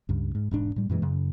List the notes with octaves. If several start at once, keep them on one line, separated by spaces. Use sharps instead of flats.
C#2 G2
G#2
E1 G#2 D4
A2 G3
F#2 A#2 E3 G#3
F#2 C#3